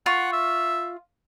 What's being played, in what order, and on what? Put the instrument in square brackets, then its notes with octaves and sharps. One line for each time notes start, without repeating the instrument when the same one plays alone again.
[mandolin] F4 C#6 [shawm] F#5
[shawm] E5